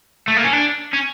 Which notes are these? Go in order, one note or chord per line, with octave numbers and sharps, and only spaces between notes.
A3
A#3
C#4
D4
C#4